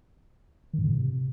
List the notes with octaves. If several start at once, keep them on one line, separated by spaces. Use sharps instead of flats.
D#3
G#2
C#3
A2
C3